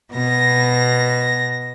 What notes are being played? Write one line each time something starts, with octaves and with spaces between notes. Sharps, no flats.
B2 A#6